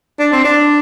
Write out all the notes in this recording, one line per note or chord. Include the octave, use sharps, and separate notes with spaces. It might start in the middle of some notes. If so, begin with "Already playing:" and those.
D4
C4
D4